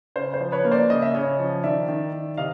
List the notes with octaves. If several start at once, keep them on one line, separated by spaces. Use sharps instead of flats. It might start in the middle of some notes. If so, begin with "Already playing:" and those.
C#3 C5
C5
F3
B4 C#5
A#3
C5 D5
C#3 D#5
E5
C#3 C#5 D#5
F3
D#3 D5 E5
D#3
D#3
C3 D#5 F5